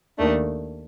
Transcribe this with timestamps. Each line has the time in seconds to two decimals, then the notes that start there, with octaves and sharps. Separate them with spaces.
0.17 D#2 D#3 A3 D4